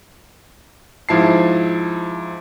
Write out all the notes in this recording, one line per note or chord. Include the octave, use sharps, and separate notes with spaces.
G#2 F3 E4 A5 C7